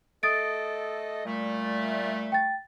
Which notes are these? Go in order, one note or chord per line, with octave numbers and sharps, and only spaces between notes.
A3 A4 D#5 D#6 A6 D7
A#2 G3 A3
G5 A6